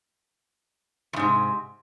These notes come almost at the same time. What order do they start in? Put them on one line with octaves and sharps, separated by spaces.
E2 G#2 C3